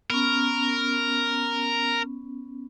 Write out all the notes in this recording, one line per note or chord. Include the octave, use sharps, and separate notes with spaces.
B3 C#4 A#4